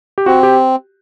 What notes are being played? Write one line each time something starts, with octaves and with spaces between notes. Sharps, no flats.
G4
C4 F#4
G4